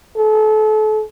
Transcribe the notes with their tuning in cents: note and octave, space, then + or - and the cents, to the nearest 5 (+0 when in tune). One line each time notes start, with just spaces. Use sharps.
A4 -35